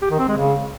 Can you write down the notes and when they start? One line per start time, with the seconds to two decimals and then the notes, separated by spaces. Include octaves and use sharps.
0.02 G4
0.11 D#3
0.19 C4
0.28 G#3
0.37 C#3